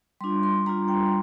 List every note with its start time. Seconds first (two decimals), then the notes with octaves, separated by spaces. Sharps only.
0.21 G3 D4 F4 C6
0.43 C6
0.66 G3 D4 F4 A#5
0.88 G5